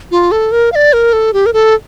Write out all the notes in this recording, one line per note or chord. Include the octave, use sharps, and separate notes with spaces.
F4
A4
A#4
F5
D5
A#4
A4
G4
A#4
A4